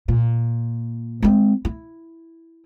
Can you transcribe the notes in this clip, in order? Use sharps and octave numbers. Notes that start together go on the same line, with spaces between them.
A#2
G#3 C4
E4